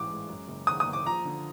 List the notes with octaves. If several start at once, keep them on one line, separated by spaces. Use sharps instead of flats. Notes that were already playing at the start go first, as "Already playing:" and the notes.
Already playing: A1 G#2 E3 D6
G#3
F#2
F#1
D#3 D#6
D#6
F#1
D6
F3 A#5
D3